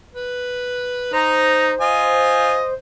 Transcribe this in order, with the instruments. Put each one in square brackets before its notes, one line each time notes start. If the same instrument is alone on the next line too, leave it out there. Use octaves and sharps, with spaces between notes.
[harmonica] B4
[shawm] D#4 [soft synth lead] C5 [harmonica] A#5
[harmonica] F4 G#5 [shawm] D#5